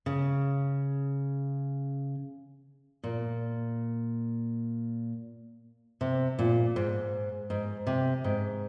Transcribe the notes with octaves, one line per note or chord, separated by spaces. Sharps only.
C#3
A#2
C3
A#2
G#2
G#2
C3
G#2